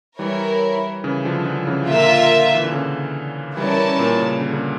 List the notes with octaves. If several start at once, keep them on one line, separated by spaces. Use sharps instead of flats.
E3 G3 E4 A#4 C#5
C#3 E3
D3 F3
D3 F3
C#3 E3
A#2 D3 F4 A#4 E5
E3
D3
C#3
E3 G3 C#4 E4 A#4 D5 A5
A#2
C#3
D3
C#3